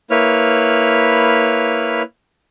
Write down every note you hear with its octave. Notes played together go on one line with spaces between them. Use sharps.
A#3 E4 B4 C#5 F6